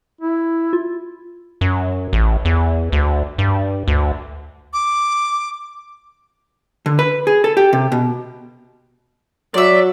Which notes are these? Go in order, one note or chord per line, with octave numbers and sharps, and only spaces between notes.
E4
F4
F#2
A1
E2
D2
G2
D2
D6
D3
B4
G#4
A4
G4
C3
B2
F#3 D5 E5